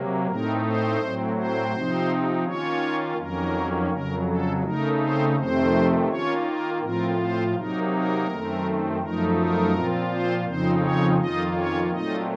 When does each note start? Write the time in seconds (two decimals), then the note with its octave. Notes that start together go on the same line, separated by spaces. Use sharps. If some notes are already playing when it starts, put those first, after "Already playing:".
Already playing: C3 F#3 A#3
0.27 A2 A3 C4 D#4 A#4
0.63 C4 C5
1.00 A2 F#3 C4
1.35 C4 C5
1.72 C3 F3 C4 D#4
2.45 D#3 A#3 C#4 F4 C#5
3.17 F2 D#3 F#3 A#3 C#4 A#4
3.90 F2 C#3 F#3 A#4
4.27 A4
4.63 C#3 A3 D#4 A#4
4.99 C4 C5
5.36 F2 C3 D#3 A3 C4 C5
6.08 D#3 A#3 C#4 F4 C#5
6.45 A#4
6.81 A2 F3 C4 F4 A#4
7.18 C4 C5
7.54 C3 F#3 A#3 D#4 A#4
7.91 A#4
8.27 F#2 D#3 A3 C4
9.00 F#2 F3 A3 D#4 A#4
9.36 A#4
9.72 A#2 F3 C4 F4
10.08 C4 C5
10.45 F2 C#3 F3 C4 D#4 C5
10.81 C#4 C#5
11.17 F2 D#3 A#3 D#4 F4 D#5
11.54 C#4 C#5
11.91 A#2 F#3 A3 C4 D#4 F4 D#5